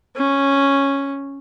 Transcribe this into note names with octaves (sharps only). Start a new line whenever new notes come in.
C#4